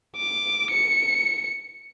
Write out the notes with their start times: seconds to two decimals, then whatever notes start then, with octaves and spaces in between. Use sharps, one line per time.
0.17 D6
0.71 C#7